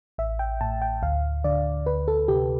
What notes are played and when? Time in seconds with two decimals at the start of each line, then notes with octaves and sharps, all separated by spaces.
0.18 A1 E5
0.39 G5
0.61 A2 A5
0.82 G5
1.02 D2 F5
1.44 D3 D5
1.86 D2 B4
2.08 A4
2.28 C3 G4